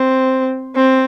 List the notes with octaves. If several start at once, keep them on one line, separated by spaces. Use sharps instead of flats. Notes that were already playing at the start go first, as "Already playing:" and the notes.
Already playing: C4
C4